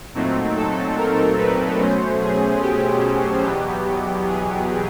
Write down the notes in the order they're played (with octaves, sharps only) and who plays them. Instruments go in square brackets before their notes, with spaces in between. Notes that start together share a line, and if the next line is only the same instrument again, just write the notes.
[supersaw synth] A#2 F#3 A3 C4 D#4
A4
A#4
B4
B2 F#3 A3 C#4 C5
G#4
G4
E2 B2 F#3 B3 G4
G#4